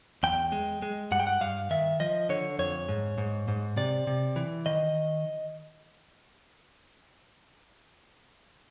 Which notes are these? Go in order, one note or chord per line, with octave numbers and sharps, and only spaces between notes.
E2 G5
G#3
G#3
G2 F#5
G5
F#5
G2 F5
D#3 E5
F3 D#5
D3 C#5
F2 C#5
G#2
G#2
G#2
C3 D5
C3
E3
D#3 D#5